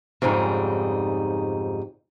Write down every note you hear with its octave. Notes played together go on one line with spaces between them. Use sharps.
F2 G#2 C#3 G3 D#4